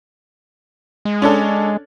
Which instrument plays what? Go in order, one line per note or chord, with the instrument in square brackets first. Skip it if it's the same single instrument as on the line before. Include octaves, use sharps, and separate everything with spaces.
[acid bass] G#3
[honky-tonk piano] C#4 D4 A4